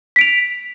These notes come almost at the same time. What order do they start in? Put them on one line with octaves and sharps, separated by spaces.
B6 D7 F7